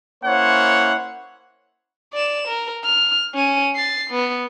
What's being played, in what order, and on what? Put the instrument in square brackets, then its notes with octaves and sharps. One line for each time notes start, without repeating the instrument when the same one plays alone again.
[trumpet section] A#3 C#4 E4 C5 C#5 F#5
[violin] D5 E7
A#4
F6
C#4 D#7
A6 C7
B3